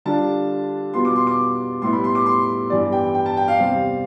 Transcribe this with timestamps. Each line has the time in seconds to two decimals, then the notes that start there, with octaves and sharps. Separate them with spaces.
0.05 D3 G3 D4 F4 A5
0.94 B2 G3 B3 F4 C6
1.05 D6
1.16 C6
1.27 D6
1.82 A2 G3 B3 E4 C6
1.93 B5
2.04 C6
2.15 D6
2.26 C6
2.70 G2 E3 G3 B3 D5
2.92 G5
3.15 G5
3.26 A5
3.37 G5
3.48 F5
3.58 E2 C3 G3 C4 F5